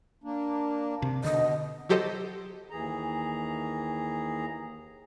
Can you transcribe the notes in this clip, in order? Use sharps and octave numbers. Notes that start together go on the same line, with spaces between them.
A#3 D4
C3
B2 D3 D#5
F#3 G4 A4 C5 D#5
D#2 E3 G#4 A#5